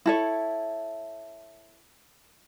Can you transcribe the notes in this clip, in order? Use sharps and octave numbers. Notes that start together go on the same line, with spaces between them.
E4 A4 C#5